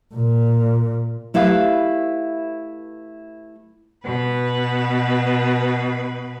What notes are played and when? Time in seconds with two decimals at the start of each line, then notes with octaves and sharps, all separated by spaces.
0.15 A#2
1.34 A3 E4 G4 B4 F5
4.04 B2 B4